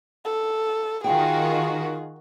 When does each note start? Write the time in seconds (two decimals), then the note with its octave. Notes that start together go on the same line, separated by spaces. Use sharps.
0.25 A4
1.04 D#3 F4 F#4 G#4 G5